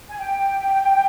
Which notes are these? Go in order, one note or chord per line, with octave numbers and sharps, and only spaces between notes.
G#5
G5